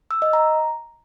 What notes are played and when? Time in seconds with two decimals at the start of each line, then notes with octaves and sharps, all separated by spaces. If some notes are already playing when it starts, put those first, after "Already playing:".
0.11 E6
0.22 D#5
0.33 A#5